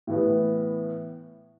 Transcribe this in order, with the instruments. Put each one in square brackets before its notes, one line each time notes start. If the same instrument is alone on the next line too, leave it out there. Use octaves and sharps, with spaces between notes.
[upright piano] A2 E3 B3